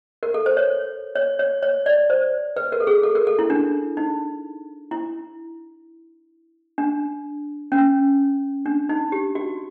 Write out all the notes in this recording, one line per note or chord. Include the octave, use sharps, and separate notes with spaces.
A#4
A4
C5
C#5
C#5
C#5
C#5
D5
C5
B4
A#4
A4
G#4
A4
A#4
A4
E4
D4
D#4
E4
D4
C#4
D4
D#4
G4
F#4